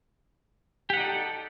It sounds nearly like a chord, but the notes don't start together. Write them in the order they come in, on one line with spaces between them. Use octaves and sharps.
G4 F#5 D#4 D5 A4